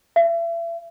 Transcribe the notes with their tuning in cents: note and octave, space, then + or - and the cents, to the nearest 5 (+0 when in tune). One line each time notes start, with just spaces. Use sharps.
E5 +35